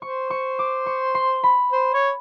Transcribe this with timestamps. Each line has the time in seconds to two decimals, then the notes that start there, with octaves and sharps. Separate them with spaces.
0.02 C5 C#6
0.30 C#6
0.59 D6
0.86 C#6
1.15 C6
1.43 B5
1.72 C5
1.94 C#5